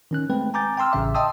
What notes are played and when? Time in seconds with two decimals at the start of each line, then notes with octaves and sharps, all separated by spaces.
0.11 D#3 C#4 F#6
0.30 G#3 A3 C4 B4 G5
0.54 G#5 A#5 D6 G6 A6
0.77 G5 A#5 C6 E6 F6
0.92 A1 C#3 E5 D6
1.14 D#5 G5 A5 C6 D#6 E6